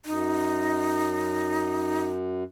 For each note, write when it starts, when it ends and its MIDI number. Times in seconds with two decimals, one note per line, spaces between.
0.06 2.44 42
0.06 2.06 63